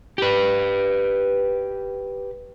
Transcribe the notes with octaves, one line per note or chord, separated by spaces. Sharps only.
G4 B4